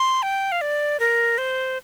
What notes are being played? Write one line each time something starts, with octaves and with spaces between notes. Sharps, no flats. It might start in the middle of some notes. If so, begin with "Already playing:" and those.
Already playing: C6
G5
F5
D5
A#4
C5